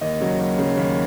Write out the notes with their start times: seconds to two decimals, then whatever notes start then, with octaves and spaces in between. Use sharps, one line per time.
0.01 D#2 D#5
0.21 C#3 F#3
0.39 D#2
0.58 C#3 F#3
0.77 D#2